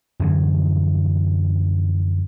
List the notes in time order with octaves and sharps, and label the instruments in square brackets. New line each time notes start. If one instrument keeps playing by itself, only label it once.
[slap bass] F#2 D3 E3 F3